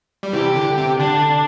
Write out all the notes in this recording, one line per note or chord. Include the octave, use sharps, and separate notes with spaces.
G3
C3 E3 G4
D3
C3
D3 D4